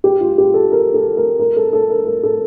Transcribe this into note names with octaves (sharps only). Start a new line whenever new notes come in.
G4
F4
G4
A4
A#4
A4
A#4
A#4
A4
A4
A#4
A#4
A4